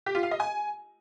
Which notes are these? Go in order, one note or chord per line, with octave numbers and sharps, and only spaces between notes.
G4
F4
F5
D#5
G#5